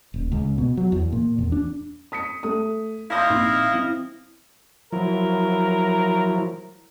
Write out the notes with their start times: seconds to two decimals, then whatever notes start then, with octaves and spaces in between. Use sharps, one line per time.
0.14 D#1
0.32 C#2
0.58 B2
0.77 F#3
0.92 E2
1.12 A#2
1.39 E2
1.52 D4
2.12 D#6 B6 C#7
2.43 A3 D#6
3.11 E4 D#5 F5 C6 G6 A#6
3.29 A#1 C4 D#4
3.73 E3 C4
4.93 F3 F#3 E4 A#4